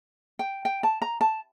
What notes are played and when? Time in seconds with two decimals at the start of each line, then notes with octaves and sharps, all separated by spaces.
0.39 G5
0.65 G5
0.83 A5
1.02 A#5
1.21 A5